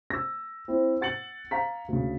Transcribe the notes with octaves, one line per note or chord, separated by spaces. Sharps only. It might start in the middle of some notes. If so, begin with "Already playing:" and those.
E6 A#6
C4 E4 C5
F#5 A6 C#7 F#7
F5 A#5 B6
D2 C#3